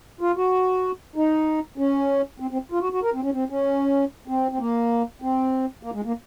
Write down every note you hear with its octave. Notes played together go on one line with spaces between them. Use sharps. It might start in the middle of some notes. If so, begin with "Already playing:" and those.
F4
F#4
D#4
C#4
C4
C4
F4
F#4
F#4
A#4
C4
C#4
C4
C#4
C4
C4
A#3
C4
A#3
G#3
A#3